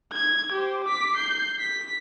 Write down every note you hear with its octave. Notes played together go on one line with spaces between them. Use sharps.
G#6
G4 C5
D6 B6
G6 C7
B6